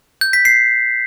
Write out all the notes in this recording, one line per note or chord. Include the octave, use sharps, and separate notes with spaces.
G6
B6
C7